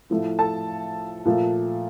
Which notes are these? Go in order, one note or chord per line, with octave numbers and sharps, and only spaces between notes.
A2 F3 A3
A4 A5
A#2 F3 A3